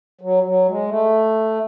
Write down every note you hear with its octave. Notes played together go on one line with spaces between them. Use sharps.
F#3
F#3
G#3
A3